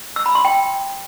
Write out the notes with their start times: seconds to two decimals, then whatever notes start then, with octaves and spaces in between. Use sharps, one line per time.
0.16 E6
0.26 B5
0.35 C6
0.45 G5